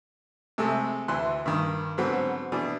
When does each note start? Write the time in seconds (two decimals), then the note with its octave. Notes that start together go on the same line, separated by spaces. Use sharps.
0.58 C3 G#3 A3 A4
1.08 D2 E3 E4 C6 F#6
1.46 G2 D#3
1.98 G#2 D3 F#3 B3 C4
2.52 B2 E3 D4